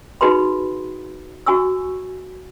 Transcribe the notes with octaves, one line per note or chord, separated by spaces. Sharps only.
D#4 F#4 G#4 B4 B5 C6
F#4 G#5 C#6 E6